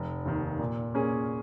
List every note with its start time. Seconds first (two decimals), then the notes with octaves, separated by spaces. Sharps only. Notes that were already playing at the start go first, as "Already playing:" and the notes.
Already playing: F1
0.26 D#2 D#3
0.59 A#2
0.94 A#3 C#4 G#4